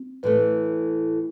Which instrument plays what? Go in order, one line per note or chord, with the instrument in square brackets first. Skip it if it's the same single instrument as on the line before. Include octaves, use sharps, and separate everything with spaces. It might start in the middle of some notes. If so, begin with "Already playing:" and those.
Already playing: [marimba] C4
[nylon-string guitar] A2 E3 A3 [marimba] B4